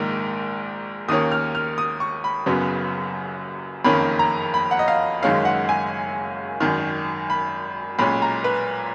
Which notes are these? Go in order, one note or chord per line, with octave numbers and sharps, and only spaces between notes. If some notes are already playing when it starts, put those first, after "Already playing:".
Already playing: A#1 G#2 D#3 A#3
D#2 D#3 A#3 C#4 D#6
F6
F6
D#6
C#6
B5
F#1 F#2 C#3 F#3 B3
F#1 F2 D#3 A#3 C#4 B5
A#5
B5
F#5
D#5
F5
F#1 F#2 D#3 G#3 C#4 F5
F#5
G#5
G#1 F#2 D#3
B5
B1 A#2 G#3 C#4 B5
A#5
B4